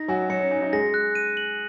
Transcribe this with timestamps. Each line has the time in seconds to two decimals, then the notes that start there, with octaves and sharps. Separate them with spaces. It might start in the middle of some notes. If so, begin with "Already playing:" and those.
Already playing: D#4 A#6
0.08 F#3 F#4 G#5
0.30 F#3 F#4 C#7
0.40 C#4
0.51 D#4 G#5
0.62 D#4
0.73 G#3 G#4 A#6
0.94 F#6
1.15 D#7
1.37 F#7